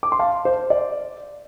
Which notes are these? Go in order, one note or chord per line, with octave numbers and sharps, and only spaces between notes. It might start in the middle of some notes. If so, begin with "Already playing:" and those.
D6
C6
F5 A5
C5
D5